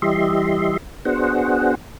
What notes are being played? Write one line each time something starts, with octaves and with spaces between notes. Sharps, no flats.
E3 G3 G4 D#5 E5 C6
B3 D4 F#4 G#4 C5 F#5